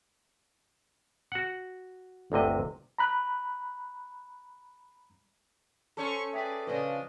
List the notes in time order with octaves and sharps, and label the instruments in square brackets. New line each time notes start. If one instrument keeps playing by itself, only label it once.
[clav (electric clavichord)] F#4 F#5
G1 D2 C3 D#5
[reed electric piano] A#5 B5 F#6
[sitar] C#4 A4 [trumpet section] C5 C#6
[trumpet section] G#4 B4 D5 [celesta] E5 G5 B6
[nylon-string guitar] C#3 F3 [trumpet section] D4 F4 D#5 [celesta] B4 D5 F5